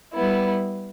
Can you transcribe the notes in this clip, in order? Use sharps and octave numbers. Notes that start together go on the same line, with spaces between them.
G3 B3 E4